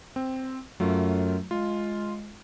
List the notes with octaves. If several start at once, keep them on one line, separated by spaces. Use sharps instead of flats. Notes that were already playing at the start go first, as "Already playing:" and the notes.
C4
F#2 F#3 A3 F4
G#3 F4